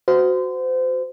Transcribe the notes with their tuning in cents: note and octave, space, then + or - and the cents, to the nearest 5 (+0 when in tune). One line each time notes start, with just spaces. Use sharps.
F#4 +0 C5 -30